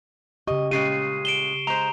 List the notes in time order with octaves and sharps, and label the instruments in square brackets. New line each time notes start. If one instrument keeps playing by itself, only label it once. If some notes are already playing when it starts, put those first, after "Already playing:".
[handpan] C#3 G4 [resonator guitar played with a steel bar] D#5 [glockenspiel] C#6
[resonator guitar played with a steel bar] A#2 C#3 G#3 [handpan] G4 [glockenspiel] C7 D#7
[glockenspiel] D7 E7 G7
[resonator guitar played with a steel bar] G#3 C5 [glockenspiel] A#5